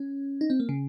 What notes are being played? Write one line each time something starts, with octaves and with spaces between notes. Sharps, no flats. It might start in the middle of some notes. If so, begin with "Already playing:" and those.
Already playing: C#4
D#4
C4
A#3
C#3